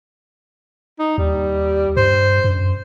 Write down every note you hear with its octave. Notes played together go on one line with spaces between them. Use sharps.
D#4
D#2 G3
G2 C5
F#2